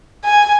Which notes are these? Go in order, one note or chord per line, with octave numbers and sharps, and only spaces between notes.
G#5